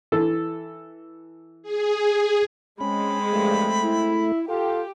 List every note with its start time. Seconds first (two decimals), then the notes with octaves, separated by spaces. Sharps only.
0.12 E3 A4
1.63 G#4
2.81 G#3 C4 C#4 B5
3.33 G2 F3 A3
3.84 E4
4.49 F4 G4 A4